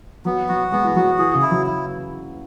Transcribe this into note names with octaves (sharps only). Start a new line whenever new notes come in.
F#3 B3
F#3 F#4
G#3 B3
E3
F#3 F#4
E3 G#4
C#3
E4
F#3
E4